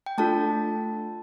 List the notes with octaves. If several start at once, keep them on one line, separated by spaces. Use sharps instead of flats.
G5
A3 D4 F4 A4 A5